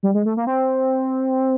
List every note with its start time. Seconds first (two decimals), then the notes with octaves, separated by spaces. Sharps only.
0.03 G3
0.14 G#3
0.25 A3
0.37 A#3
0.47 C4